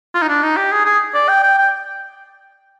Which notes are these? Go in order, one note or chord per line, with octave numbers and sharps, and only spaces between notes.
F4
D#4
D4
D#4
G4
G#4
G#4
D5
G5
G5
G5